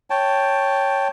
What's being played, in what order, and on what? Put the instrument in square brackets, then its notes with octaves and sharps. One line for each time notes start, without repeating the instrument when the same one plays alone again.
[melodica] C#5 G5 A5